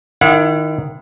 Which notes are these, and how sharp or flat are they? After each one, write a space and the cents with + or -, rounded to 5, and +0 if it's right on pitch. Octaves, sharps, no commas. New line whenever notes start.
D#3 +0 E4 +30 F#5 -35